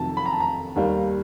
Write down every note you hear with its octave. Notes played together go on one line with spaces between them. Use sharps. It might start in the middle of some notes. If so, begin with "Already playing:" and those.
Already playing: F2 C3 D#3 F#3 A3 A5
B5
A#5
A5
A#5
D#2 D#3 G3 A#3